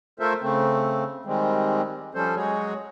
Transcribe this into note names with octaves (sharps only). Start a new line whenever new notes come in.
A3 F4 A4 A#4 C5 E5
C#3 A3 C4
D#3 G3 G#3 C4
F3 G3 C#4 A4 C5
F#3 G#3 F#4 G#4 C#5